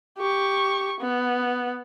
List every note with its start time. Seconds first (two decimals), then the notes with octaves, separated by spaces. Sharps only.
0.18 G4 C#6
1.00 B3